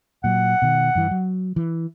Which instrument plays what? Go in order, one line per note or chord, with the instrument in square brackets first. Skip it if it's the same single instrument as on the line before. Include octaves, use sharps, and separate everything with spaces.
[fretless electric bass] A#2 F#3 [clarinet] F#5
[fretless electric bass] B2 D#3
G2 E3
F#3
E3